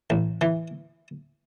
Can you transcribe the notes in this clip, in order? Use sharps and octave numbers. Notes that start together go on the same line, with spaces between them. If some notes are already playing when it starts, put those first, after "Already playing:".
A1
E3